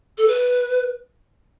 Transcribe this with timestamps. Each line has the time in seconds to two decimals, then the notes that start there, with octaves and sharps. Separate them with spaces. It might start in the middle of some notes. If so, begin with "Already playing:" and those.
0.18 A4
0.28 B4